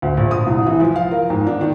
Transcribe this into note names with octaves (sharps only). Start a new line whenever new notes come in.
D2
A#1
D#6
C2
E3
F3
F5
A#4
G#2
D4
D#3